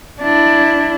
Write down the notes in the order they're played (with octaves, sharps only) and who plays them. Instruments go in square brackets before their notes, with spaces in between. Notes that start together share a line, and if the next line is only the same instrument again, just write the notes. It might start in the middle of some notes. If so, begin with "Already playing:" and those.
[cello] D4 E4